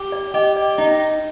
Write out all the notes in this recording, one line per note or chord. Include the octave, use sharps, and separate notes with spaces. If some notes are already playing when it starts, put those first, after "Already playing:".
Already playing: G4
D5
G4 D#5
D5
D#4 D#5